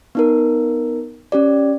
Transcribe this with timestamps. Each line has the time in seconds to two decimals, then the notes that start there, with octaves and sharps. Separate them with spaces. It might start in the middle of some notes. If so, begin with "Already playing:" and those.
0.15 B3 D#4 A#4
1.32 C#4 G4 D5